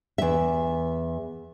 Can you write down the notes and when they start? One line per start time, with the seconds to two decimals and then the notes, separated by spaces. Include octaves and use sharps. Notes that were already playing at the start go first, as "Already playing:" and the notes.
0.18 E2 E5